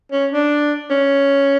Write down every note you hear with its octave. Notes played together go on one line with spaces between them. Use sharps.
C#4
D4
C#4